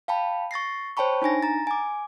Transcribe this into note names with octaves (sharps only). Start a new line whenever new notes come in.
F5 G5 A5 B5
C#6 A6 A#6 C7
C5 C#5 G5 A5 B5 C#6
D4 D#4 G#5 A#6
A#5 A6
G#5 D6